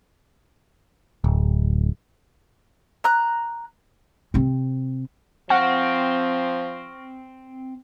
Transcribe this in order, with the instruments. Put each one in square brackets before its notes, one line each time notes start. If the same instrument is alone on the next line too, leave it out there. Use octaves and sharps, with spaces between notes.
[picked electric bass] D1
[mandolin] A#5 F#6
[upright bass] C3 C4
[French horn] F3 [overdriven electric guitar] C4 [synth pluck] F#5 [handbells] C#6 F6 A#6